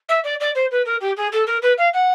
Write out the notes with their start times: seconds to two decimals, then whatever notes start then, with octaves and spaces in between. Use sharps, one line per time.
0.08 E5
0.23 D5
0.39 D5
0.54 C5
0.70 B4
0.85 A#4
1.00 G4
1.16 G#4
1.32 A4
1.46 A#4
1.62 B4
1.77 F5
1.93 F#5